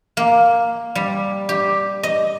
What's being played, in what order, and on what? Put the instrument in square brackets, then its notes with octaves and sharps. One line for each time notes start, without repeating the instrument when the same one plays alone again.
[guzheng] A#3
G3
G4
D#5